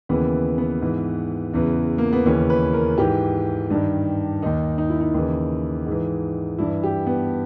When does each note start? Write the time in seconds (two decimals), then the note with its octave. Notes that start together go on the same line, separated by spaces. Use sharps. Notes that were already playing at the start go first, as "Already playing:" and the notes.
0.09 D#2 C#3 E3 B3
0.58 B3
0.82 G#2 E3
1.53 E2 C#3 E3
1.98 A#3
2.13 B3
2.26 D#2 C#3 E3 C#4
2.50 B4
2.73 A#4
2.98 G#2 E3 G4
3.70 G2 D#3
4.42 D#2 D#3 D#4
4.78 D#4
4.90 E4
5.01 D#4
5.14 D#2 C#3 E3
5.86 G#2
5.91 E3
6.58 G2 E3 E4
6.83 G4
7.06 B3